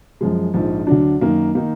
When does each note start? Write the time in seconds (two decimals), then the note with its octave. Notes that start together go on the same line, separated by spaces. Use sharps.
0.21 F#2 F3 G#3
0.54 A#1 G#2 F3
0.87 D2 D3 F#3 D4
1.21 F#2 D#3 A#3
1.55 D#3 A#3 D#4